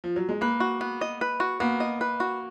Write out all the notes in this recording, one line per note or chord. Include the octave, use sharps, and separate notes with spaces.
F3
F#3
G#3
A#3 B4
F#4
B3
D#5
B4
F#4
A#3 B3
D#5
B4
F#4